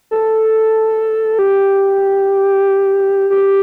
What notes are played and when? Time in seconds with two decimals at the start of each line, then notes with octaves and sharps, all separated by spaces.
0.11 A4
1.39 G4
3.30 G4